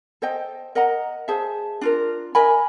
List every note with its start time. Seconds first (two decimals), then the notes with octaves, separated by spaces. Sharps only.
0.22 A4 C5 D#5 G5
0.75 A#4 D#5 F#5 A#5
1.28 G#4 C5 E5 A5
1.81 D4 F4 A#4
2.35 A#4 D#5 G#5 B5